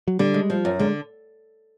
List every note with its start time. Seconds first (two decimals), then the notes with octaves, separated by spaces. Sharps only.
0.08 F#3
0.19 D3 G3
0.34 G#3
0.50 F3
0.65 F#2
0.79 D3 G#3